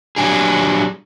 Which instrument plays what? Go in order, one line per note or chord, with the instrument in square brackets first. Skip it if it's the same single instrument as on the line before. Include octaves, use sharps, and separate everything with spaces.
[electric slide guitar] F#3 G3 D4 G#4